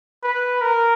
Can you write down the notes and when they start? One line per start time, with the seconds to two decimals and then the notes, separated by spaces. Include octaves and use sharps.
0.24 B4
0.62 A#4